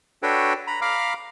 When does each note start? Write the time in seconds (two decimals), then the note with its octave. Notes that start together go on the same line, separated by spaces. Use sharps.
0.23 D4 F#4 A4 B4 C#5 G5
0.67 A#5 B5
0.82 F5 A#5 B5 D6 F6